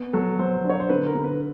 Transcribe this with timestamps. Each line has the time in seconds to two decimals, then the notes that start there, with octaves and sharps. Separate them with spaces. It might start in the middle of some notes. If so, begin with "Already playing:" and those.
Already playing: B3
0.13 F#3 A4
0.39 F#3 C5
0.64 D4
0.69 C#5
0.80 C5
0.89 D3 B4
1.06 A#4
1.15 D3
1.24 B4